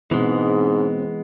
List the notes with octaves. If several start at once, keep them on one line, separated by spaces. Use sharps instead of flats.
G#2 B2 E3 G#3 B3 C4